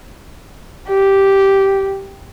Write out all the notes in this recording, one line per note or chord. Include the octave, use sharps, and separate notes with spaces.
G4